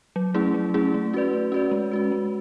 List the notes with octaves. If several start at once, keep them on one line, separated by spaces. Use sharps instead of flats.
F#3
A3 C#4 E4 G#4
F#3
A3 C#4 E4 G#4
A3
C#4 F#4 B4 D5
A3
C#4 F#4 B4 D5
G#3
C#4 F#4 B4
G#3